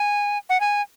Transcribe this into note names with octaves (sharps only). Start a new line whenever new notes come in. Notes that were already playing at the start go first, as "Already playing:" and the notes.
Already playing: G#5
F#5
G#5